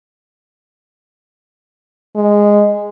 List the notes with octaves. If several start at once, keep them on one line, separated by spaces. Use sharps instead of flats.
G#3